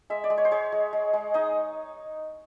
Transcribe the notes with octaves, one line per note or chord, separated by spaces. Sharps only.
G#3 E5
D5
G#3
C#5
C5
G#3 C#5
G#3
G#3
G#3
D#4 D#5